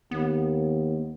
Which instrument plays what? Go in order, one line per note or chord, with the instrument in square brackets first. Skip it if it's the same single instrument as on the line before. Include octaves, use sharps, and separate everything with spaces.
[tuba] D#2 [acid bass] B3